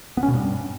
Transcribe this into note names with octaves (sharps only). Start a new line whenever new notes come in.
B3
C#4
B2
G2